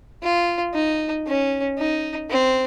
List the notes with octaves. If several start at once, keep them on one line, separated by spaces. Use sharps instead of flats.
F4
D#4
C#4
D#4
C4